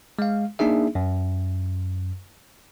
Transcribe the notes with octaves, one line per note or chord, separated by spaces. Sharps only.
G#3 F5
A#3 D4 D#4 G#4 E5
F#2